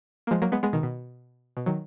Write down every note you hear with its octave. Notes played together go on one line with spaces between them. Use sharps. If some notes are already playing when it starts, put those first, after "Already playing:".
A#3
F3 G#3
F#3 A#3
G#3 B3
G#3 B3
B2 D#3
B2
B2
D#3 F#3